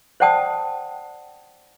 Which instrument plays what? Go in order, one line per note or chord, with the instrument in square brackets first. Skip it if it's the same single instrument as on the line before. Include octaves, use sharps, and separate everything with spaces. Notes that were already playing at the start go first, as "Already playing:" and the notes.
[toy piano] C5 D5 F#5 G5 A5 D#6